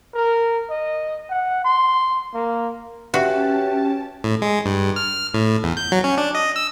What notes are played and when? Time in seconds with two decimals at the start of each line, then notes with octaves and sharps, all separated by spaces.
0.14 A#4
0.70 D#5
1.30 F#5
1.64 C6
2.34 A#3
3.14 C#4 F#4 G4 B4 E5 A5 F#6
4.24 A2
4.42 G#3
4.66 G2
4.96 F6
5.34 A2
5.64 E2
5.77 G6
5.92 F#3
6.04 C#4
6.18 D4
6.35 D#5
6.56 E6